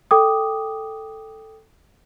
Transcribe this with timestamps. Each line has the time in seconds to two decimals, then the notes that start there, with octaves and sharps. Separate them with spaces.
0.11 A4 G5 D6 D#6